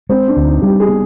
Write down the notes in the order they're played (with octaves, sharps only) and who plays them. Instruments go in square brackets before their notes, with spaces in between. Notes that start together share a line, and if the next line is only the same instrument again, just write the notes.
[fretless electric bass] G#3 [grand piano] C4
[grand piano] D4
[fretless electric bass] D2
[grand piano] D#4
[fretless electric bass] G3 [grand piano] G4
[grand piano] G#4
[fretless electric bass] B3